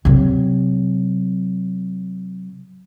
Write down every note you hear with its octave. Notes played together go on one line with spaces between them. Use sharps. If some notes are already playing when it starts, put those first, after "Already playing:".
C3 F#3